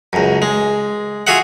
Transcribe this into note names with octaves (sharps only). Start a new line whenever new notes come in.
C#2 F#2
G#3
F4 F#4 G#4 E5 F#5